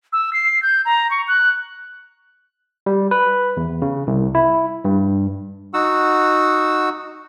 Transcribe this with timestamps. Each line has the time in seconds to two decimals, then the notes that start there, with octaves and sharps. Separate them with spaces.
0.13 E6
0.33 C7
0.63 G6
0.85 A#5
1.11 C#6
1.28 F#6
2.86 G3
3.11 B4
3.57 E2
3.82 C#3
4.07 C2
4.35 E4
4.85 G2
5.74 D#4 F#4 F#5 E6